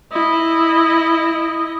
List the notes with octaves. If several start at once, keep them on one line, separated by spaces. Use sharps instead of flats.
E4 D#5